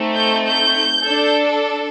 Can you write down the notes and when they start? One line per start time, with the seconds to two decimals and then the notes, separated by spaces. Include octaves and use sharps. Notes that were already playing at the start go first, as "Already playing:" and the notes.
Already playing: A3 C4 D#4 A4
0.15 G6
0.45 G6
1.04 D4 A4